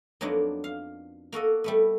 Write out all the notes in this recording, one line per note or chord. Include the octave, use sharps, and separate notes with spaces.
F2 F#3 A#3 B3 D4 D#4
F5
A#3 F#4 A4 D#5
G3 A3 B3